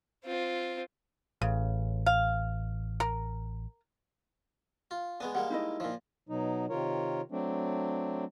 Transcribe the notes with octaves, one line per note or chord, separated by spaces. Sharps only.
C4 F4
A1 C#3
F5
A#4
F4
G#3 B3 D4 G#5
G3 G#3 A#3 F#5
D#4 E4 D#5
A#2 F3
B2 F#3 D#4
C3 D#3 F4 A#4 C#5
F#3 A3 C4 D4